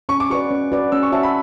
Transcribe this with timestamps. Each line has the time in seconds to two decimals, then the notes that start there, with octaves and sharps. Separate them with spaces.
0.09 C#4 C#6
0.20 D6
0.30 F#4 B4 D5 C#6
0.51 C#4
0.72 F#4 B4 D5
0.92 C#4 E6
1.03 C#6
1.12 F#4 C#5 E5 A5
1.23 B5